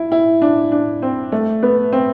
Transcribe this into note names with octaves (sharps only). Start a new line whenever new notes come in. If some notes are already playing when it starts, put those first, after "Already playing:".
Already playing: E4
E4
D4
D4
C4
A3
B3
C4